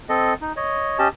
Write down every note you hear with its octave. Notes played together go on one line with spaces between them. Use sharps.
C4 A4 D#5
D#4
C#5 D#5
C#4 G4 D#5 A5